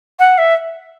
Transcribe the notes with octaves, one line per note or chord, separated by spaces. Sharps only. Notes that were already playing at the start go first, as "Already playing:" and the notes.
F#5
E5